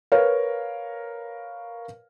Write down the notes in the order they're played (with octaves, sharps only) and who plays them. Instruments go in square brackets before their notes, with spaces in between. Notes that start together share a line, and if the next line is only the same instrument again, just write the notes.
[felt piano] A#4 B4 C#5 F5